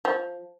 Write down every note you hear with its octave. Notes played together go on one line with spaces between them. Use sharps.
F3